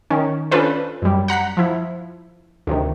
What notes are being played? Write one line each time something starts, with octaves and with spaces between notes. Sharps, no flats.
D#3 C#4
C#4 D4 F4 A4 B4 C5
F#2 G3
F#5 A#5 F#6 B6
F3 E4
D2 C3 D#3